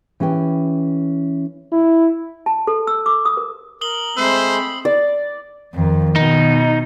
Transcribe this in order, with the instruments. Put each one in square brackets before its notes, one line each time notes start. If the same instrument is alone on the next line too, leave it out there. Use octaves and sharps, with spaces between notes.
[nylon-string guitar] E3 C#4 G4 G5
[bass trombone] E4
[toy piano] A5
A4
E6
D6
D#6
A#4
[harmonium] A#4 [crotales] D#6 F#7 G7
[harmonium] G#3 A3 [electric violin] C4 B5 [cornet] C5 [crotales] E6 C7
[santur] D5
[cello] F2 [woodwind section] D#3
[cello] B2 [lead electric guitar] D#4